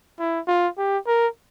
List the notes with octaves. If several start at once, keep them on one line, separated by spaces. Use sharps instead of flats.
E4
F4
G4
A#4